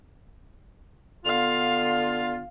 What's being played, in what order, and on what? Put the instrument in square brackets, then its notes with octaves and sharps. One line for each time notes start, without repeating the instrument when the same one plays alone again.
[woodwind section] D3 B3 F4 [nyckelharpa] F5